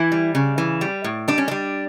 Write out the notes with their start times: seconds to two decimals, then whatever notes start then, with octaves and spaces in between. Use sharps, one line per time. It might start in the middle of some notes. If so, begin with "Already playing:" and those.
Already playing: E3 E4
0.12 G3
0.35 C#3
0.58 E3
0.81 G3
1.04 A2
1.28 G3 D4
1.38 C#4
1.48 G3 D4